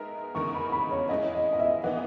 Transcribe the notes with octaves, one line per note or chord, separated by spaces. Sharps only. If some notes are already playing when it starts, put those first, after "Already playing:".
Already playing: G#3 B3 D#4 A#4 E5 A#5
E2 C#3 G#3 D#4 A#4 C#6
B5
B5
C#5
G#3 C#4 E4 D#5
D#5
D#5
E5
E3 B3 D#4 F#5